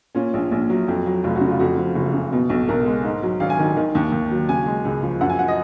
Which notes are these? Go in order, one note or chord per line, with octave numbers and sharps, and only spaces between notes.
A#2 C#4
A#1
A#1
F#3
F2
F#3
F1 F4
F#4
C#3
F4
F2 F#4
F3
F#1
C#3
B2
B1
B1 A#4
G#3
G#2
F#3
G#1 F5
G#5
D#3
D#3
D#2
D#2
F#3
C#3 G#5
G#3
C#2
F3
F#2 F#5
G#5
F#5
D#5